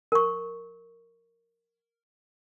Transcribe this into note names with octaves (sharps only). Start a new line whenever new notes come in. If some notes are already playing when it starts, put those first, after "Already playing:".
A#4 C#6